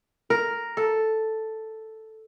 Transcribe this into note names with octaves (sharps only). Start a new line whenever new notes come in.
A#4
A4